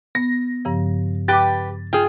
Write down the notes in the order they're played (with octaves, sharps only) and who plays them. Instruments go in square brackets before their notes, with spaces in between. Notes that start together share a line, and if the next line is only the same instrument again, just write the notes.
[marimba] B3 [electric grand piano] A#6
[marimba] G2 C#3 F3
[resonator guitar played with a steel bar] G4 B4 [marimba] D6 F#6 [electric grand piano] A6
[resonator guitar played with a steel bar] F4 [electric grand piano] G#4 G5